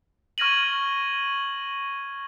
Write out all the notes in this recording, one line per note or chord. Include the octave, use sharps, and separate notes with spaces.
C#6 F6 G#6 A#6 D#7 F#7